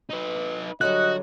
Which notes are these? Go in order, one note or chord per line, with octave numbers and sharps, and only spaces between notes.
D#4 B4
D3 F#3 G3 F#4 D#5 F#6